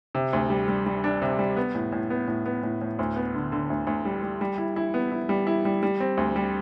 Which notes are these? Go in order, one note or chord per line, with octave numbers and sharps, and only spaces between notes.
C3
D2
G3
G3
G3
D4
C3
G3
B3
A2
A2
B3
A2
B3
A2
A2
D2
B3
D3
D3
D2
D2
G3
G3
G3
E4
E4
B3
E4
G3
E4
G3
G3
C4
D2
G3